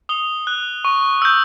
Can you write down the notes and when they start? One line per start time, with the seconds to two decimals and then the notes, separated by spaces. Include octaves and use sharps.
0.09 D#6 F7 G7
0.47 F#6
0.85 C#6
1.22 E6 G6